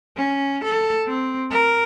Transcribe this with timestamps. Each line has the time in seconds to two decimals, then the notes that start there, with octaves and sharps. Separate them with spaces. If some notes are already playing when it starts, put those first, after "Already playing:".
0.16 C#4
0.64 A4
1.07 C4
1.51 A#4